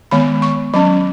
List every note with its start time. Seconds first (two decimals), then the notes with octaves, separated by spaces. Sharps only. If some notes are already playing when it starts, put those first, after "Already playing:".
0.11 D#3 G#3 B3 B5
0.42 C#6
0.74 F#3 C#4 B5